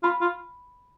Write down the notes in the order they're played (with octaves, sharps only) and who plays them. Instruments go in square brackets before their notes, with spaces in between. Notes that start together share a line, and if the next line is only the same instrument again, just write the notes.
[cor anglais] F4 [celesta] B5
[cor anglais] F4